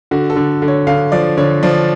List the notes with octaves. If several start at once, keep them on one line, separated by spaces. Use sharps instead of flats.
D3 F#4
A4
D3
D3
C#5
D3 F5
F3 D5
D3 C#5
F3 D4